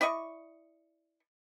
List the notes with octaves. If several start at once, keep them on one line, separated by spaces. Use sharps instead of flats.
E4 D5 D#5 C#6